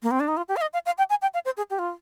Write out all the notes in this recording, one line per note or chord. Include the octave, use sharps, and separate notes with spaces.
A#3
C4
D4
D#4
F4
G4
F5
D#5
F5
F5
G5
G#5
G5
F5
C5
G#4
G4
F4